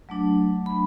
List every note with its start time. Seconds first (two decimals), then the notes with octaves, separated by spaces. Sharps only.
0.09 F#3 A3 D4
0.66 B5